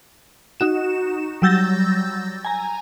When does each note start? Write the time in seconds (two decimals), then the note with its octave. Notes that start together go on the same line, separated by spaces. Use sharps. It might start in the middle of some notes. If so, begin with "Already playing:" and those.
0.60 D#4 F#4 E7
1.42 F#3 G3 E6 G6 A6 A#6
2.45 G#5 A#5